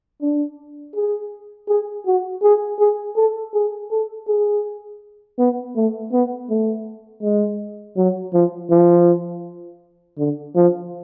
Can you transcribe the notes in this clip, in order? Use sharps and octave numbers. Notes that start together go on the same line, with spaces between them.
D4
G#4
G#4
F#4
G#4
G#4
A4
G#4
A4
G#4
B3
A3
B3
A3
G#3
F#3
F3
F3
D3
F3